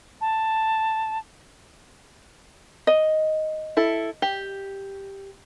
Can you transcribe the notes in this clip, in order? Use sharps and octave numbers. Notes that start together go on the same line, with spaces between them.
A5
D#5
E4 A4
G4